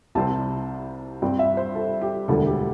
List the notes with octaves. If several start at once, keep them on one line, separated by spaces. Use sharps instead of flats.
C2 C3 G3 C4 A5
G2 G3 C4 G5
E5
C5
A4
G4
E1 D2 D3 G3 A4
G4